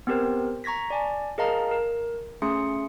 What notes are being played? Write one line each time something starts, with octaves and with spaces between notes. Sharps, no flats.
B3 C4 G4 A#4 C5
A#5 C#6 G#6 A#6 B6
D5 G#5 A5
G#4 A#4 D#5 F5 A5 A#5
A#4
A3 C#4 G#4 C6 D#6 C#7